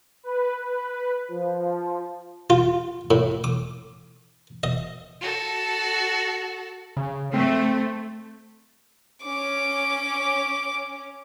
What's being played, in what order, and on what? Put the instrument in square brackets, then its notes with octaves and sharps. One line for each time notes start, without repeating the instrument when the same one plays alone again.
[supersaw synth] B4
B4
F3
[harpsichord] F4
A2
D6
D#5
[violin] F#4 A4
[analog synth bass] C#3
[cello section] A3 [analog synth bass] C4
[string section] C#4 [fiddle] D6